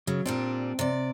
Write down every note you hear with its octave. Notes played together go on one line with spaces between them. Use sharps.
C#3 F#3
A#2 G3 C4 D4
C3 D5